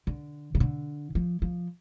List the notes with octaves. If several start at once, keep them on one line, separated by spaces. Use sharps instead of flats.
D3
C#3
D3
F3
F3